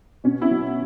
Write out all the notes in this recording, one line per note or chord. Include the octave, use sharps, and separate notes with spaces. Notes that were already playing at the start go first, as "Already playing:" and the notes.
B2 C#4
C#4 E4
F#3